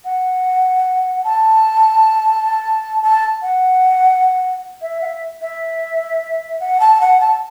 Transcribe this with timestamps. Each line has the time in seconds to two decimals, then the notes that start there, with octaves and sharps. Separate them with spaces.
0.05 F#5
1.24 A5
3.03 A5
3.42 F#5
4.82 E5
5.02 F#5
5.05 E5
5.42 E5
6.60 F#5
6.80 A5
7.01 F#5
7.20 A5